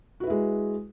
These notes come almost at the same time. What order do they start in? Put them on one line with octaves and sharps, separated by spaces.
F#4 B4 E4 G#3